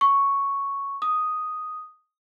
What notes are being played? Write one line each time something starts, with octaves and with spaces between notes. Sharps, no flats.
C#6
D#6